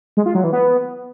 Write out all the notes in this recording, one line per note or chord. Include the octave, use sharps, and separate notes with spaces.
G#3
F4
F#3
E3
B3